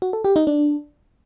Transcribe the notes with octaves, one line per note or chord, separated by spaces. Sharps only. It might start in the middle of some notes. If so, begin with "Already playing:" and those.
F#4
A4
G4
D#4
D4